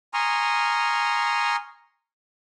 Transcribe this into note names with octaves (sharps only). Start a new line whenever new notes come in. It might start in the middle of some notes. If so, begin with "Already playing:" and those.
G#5 A#5 C6 C#6 D#6 F6